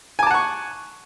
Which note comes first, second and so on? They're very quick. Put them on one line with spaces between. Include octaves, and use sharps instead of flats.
G#5 D6 A5 F#5 C#6